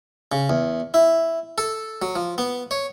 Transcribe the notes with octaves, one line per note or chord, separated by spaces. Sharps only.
C#3
E2
E4
A4
F#3
F3
B3
C#5